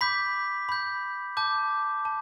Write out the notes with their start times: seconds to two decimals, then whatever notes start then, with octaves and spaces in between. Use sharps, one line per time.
0.01 B5 D6 G6 B6
0.69 B5 G6
1.37 A5 D6 G6
2.05 A5